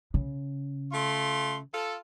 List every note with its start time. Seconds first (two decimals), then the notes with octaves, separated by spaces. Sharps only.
0.14 C#3
0.92 A3 F4 C6
1.72 F4 A4